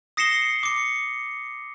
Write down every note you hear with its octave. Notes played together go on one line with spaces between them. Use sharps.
D#6 A#6 C7 C#7 E7 G7
D6 C#7